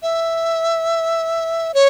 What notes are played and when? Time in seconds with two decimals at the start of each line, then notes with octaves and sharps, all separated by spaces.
0.03 E5
1.74 C#5